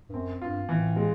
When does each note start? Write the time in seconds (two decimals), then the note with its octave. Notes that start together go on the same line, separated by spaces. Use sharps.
0.09 G2
0.14 F#2 C4
0.41 G2 F4
0.69 A2 E3
0.96 G#3